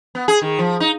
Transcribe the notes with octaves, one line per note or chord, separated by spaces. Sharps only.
B3
G#4
D#3
F3
D#4